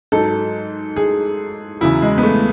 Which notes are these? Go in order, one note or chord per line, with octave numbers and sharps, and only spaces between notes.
G#2 F#3 A4
G#4
E2 C#3 F#3 E4
G#3
B3
A3